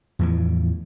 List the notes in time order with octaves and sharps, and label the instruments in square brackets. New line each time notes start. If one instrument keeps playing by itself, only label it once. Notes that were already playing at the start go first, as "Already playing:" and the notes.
[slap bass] E2 A2 E3 F3